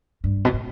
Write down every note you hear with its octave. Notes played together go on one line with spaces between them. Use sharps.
G2
B2
A2